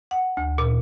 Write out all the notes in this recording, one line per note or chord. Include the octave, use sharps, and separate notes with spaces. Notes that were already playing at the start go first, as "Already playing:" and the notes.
F#5
D2
A#2